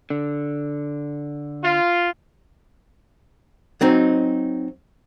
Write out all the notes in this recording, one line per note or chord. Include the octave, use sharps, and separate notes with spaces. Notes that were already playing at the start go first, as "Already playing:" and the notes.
D3
F4
F#3 C4 D#4